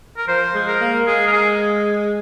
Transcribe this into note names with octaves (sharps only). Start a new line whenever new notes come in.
A#4
F3 C5
G#3
A#4
A#3
G#3 G#4
A#4
G#4